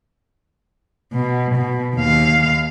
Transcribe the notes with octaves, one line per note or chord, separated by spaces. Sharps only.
B2
B2
D#2 F5